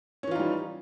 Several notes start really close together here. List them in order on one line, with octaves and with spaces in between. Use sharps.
C#4 E3 F4 D#4 G3